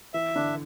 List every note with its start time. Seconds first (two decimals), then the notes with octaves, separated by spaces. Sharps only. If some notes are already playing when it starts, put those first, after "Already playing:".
0.14 E3 E5
0.36 D3 D4